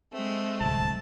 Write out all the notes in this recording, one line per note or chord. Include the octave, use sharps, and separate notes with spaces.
G#3 A3 C4
D1 C2 A5